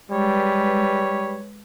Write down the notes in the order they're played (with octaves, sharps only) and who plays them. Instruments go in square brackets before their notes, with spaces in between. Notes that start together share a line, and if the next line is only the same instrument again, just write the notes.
[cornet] G3 [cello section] G#3 B4 [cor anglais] C#5